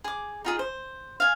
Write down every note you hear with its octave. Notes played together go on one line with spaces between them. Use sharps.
G#4 D6
D#4 F4 G#4
C5
F5 G#5